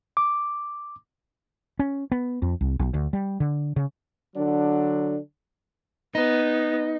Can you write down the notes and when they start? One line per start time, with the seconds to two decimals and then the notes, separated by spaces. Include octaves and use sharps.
0.17 D6
1.79 C#4
2.12 B3
2.42 F2
2.61 C2
2.79 B1
2.94 D2
3.13 G3
3.40 D3
3.76 C#3
4.35 D3 F#3 D4
6.15 B3 D#4